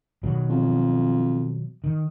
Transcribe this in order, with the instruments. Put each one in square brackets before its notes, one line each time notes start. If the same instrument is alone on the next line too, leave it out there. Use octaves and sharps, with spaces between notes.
[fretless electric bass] B2 D#3 F#3
[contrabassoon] F2
[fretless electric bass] D#3